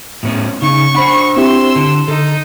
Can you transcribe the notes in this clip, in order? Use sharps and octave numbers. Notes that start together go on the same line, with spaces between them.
A2 B3 C#4
C#3 D#4 C#6
D4 C5 F#5 B5
C4 E4 G4 C6 E6
D3
D3 D#4 A4